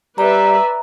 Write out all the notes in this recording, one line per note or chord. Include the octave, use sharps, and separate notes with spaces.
G3 B4 D5 E5 A#5